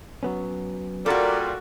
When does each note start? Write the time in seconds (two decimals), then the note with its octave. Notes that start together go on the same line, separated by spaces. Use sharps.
0.23 F#3 B3 C#4
1.06 A#2 G3 F#4 A4 A#4 D5